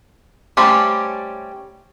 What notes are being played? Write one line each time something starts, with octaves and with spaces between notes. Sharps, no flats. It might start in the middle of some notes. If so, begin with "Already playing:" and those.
G3 A3 C#4 G4 C5